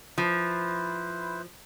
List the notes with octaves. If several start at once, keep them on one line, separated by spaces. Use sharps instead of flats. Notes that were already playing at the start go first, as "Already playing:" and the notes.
F3 E4 B4 C5